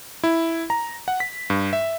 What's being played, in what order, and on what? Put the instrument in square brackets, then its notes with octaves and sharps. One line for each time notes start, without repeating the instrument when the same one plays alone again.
[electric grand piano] E4
A#5
F#5
B6
G2
E5